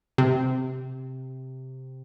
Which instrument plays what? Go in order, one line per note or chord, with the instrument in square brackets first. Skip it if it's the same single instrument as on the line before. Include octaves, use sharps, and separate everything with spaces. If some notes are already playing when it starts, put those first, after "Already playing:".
[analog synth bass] C3